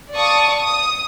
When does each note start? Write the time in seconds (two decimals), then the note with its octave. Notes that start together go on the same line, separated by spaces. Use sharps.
0.14 D5 F5 A5 C#6 D#6
0.62 D#6